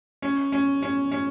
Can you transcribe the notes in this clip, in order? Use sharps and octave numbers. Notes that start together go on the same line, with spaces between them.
C#4
C#4
C#4
C#4